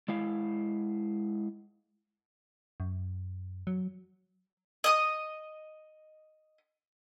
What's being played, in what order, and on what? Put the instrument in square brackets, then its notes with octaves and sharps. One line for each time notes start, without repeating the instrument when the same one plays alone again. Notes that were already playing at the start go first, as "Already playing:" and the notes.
[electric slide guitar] G#3 E4 F5
[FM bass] F#2
F#3
[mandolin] D#5 D#6